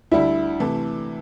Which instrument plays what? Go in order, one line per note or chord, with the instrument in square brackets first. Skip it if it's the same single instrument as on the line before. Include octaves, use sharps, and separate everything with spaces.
[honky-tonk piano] D2 D3 G3 [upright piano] E4
[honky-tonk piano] C3 E3 A3